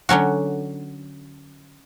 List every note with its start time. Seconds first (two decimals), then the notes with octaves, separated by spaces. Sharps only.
0.09 D3 F#3 C#4 F#4